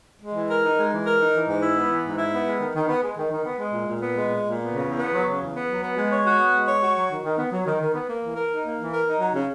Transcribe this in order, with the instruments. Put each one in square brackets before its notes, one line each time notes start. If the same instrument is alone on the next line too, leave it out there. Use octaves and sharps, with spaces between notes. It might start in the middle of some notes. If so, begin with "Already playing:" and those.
[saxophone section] G#3
E3
A#4
D#4
G#3
E3
A#4
D#4
E3
G#2
E4
B3
E3
G#2
E4
B3
G#3
D#3
D#3
B3
G#3
D#3
D#3
B3
G#3
A#2
A#2
B3
G#3
A#2
A#2
B3
C#3
E2
B3
F#3
C#3
E2
B3
F#3
B3
G#3
C#5
F#4
B3
G#3
C#5
F#4
F#3
D#3
D#3
B3
F#3
D#3
D#3
B3
A#3
E3
A#4
D#4
A#3
E3
A#4
D#4
F#3
C#3